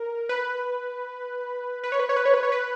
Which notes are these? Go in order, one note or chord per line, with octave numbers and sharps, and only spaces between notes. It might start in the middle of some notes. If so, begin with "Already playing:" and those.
Already playing: A#4
B4
B4
C#5
B4
C#5
B4
C#5
B4
C#5
B4